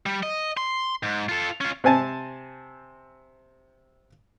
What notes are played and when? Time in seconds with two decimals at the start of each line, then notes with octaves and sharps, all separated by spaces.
0.06 G3
0.23 D#5
0.57 C6
1.03 G#2
1.29 F4 A4
1.61 C#4 F4
1.84 C3 C4 G#5 A5